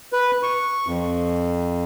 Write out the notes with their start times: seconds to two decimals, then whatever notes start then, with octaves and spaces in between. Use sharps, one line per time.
0.13 B4
0.43 C#6
0.87 F2